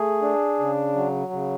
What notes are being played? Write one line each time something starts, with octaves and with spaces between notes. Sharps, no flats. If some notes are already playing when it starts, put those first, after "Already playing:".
Already playing: A3 G#4
D4
C#3
F#3
C#3